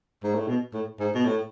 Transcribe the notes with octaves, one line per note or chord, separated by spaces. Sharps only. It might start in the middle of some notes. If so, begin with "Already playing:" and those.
G#2
A2
B2
A2
G#2
B2
A2